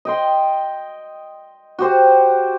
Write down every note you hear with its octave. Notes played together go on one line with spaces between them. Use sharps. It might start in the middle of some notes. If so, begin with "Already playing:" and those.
D#5 G5 C6
F#4 G4 C5